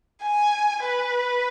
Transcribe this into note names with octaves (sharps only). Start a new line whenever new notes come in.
G#5
B4